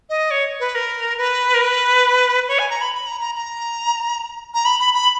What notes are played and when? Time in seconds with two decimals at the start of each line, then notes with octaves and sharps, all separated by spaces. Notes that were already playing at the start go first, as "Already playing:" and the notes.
0.10 D#5
0.31 C#5
0.60 B4
0.75 A#4
1.18 B4
1.54 A#4
1.61 B4
2.48 C#5
2.59 G#5
2.70 A#5
2.81 B5
2.95 B5
3.07 A#5
3.20 A#5
3.35 A#5
4.54 A#5
4.65 B5
4.80 B5
4.94 B5